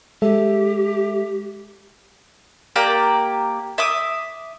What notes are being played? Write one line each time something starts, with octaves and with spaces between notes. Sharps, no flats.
G#3 G4 A4 E5
A#3 G4 D5 A#5
E5 D6 D#6